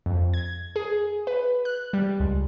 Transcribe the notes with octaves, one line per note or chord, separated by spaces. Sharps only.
F2
G#6
G#4
B4
F#6
G3
C#2